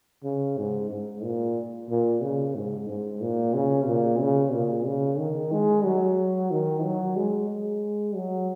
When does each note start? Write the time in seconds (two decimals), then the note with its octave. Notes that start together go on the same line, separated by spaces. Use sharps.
0.24 C#3
0.58 G#2
0.91 G#2
1.23 A#2
1.90 A#2
2.22 C#3
2.55 G#2
2.89 G#2
3.21 A#2
3.54 C#3
3.87 A#2
4.21 C#3
4.53 A#2
4.86 C#3
5.19 D#3
5.52 G#3
5.85 F#3
6.51 D#3
6.84 F#3
7.16 G#3
7.49 G#3
8.15 F#3